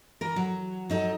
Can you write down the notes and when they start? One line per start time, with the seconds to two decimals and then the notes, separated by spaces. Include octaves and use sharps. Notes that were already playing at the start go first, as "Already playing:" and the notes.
0.21 E3 A#4
0.36 F#3
0.90 F#3 D#4 A4